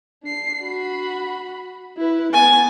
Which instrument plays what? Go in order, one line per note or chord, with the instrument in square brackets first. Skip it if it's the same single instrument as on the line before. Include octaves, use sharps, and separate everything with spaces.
[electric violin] D4 C7
F#4 B5
E4 B4
[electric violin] B3 A6 [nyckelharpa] G#5